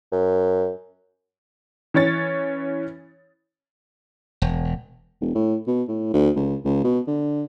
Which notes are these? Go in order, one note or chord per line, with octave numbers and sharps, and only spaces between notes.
F#2
E3 C#4 C#5 A6
E1
E1
A2
B2
A2
D2
C#2
C#2
B2
D3